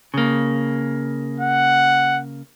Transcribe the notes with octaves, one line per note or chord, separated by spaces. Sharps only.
C#3 A#3
F#5